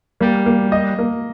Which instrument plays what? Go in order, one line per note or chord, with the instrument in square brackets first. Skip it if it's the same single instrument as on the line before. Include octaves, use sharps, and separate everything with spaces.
[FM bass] G3 [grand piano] A#3
[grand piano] A#3
D#5
A#3